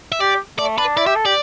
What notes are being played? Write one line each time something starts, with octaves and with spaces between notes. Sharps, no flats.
E5
G4 D5
A3 D5
D4 B4
E4 D5
G4 E5
A4
G4 D5